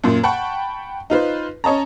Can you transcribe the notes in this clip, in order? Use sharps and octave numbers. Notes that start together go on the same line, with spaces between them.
F#2 A#2 A#3
F#5 G5 A5 B5 C#6
D#4 F4 B4 C5
C#4 C#5 D#5 A5 A#5